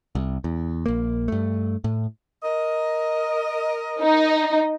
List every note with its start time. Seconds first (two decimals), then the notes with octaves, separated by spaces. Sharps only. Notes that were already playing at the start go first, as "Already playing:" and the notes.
0.15 C2
0.44 E2
0.86 A#1 A#3
1.28 G2 A3
1.84 A2
2.43 A#4 D#5
4.01 D#4